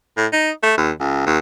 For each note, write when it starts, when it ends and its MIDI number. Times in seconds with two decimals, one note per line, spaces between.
0.17 0.27 45
0.33 0.51 63
0.63 0.74 57
0.78 0.91 39
1.00 1.22 37
1.27 1.38 39